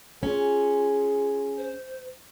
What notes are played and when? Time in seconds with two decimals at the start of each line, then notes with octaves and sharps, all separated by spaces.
0.23 C#4 F4 G#4
1.58 C5